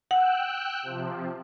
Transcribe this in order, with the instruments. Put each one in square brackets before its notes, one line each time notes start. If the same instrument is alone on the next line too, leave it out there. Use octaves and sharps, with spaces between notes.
[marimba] F#5 [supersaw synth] G5 E6 F#6
[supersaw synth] C3 F3